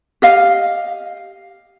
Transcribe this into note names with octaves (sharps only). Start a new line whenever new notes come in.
G4 D#5 F5